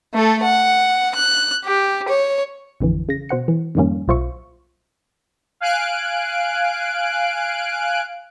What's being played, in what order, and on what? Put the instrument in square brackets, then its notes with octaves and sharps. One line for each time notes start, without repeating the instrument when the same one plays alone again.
[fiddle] A3 A4
F#5
F#6
G4
C#5
[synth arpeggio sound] A1 F2 D3 E3
C#3 A#6
B2 C5 F#5 C#7
E3
F2 G#2 D#3 G3 A#3 C#4
B1 A#2 F4 C5 E5 C#6
[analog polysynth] F5 G#5 F#6 D7